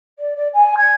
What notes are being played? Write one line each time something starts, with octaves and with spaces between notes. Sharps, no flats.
D5
D5
G#5
G#6